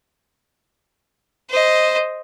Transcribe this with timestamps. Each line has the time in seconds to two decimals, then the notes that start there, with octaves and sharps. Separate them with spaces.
1.50 C5 D#5